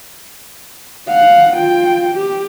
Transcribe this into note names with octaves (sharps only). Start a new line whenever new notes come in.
F5 F#5
F4 G5
G4